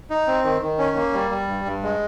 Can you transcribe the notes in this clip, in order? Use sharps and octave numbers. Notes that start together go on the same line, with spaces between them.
D#4
C4
D#3
D#3
C#4
A#3
G3
G3
G2
G2
G#3